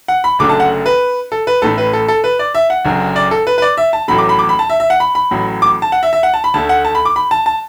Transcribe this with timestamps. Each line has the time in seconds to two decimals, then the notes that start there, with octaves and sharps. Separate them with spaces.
0.08 F#5
0.24 B5
0.39 F#1 F#2 D3 A3 D6
0.49 A5
0.60 F#5
0.86 B4
1.32 A4
1.47 B4
1.62 A1 A2 A3 A4
1.78 B4
1.93 A4
2.08 A4
2.24 B4
2.39 D5
2.55 E5
2.70 F#5
2.85 F#1 F#2 D3
3.16 D5
3.31 A4
3.47 B4
3.58 B4
3.62 D5
3.77 E5
3.93 A5
4.08 A1 A2 F#3 A3 B5
4.18 D6
4.29 B5
4.39 D6
4.49 B5
4.59 A5
4.70 E5
4.80 E5
4.90 F#5
5.00 B5
5.15 B5
5.31 A1 A2 F#3
5.62 D6
5.82 A5
5.92 F#5
6.03 E5
6.13 E5
6.23 F#5
6.34 A5
6.44 B5
6.54 D2 D3 A3 A5
6.69 F#5
6.85 A5
6.95 B5
7.05 D6
7.16 B5
7.31 A5
7.46 A5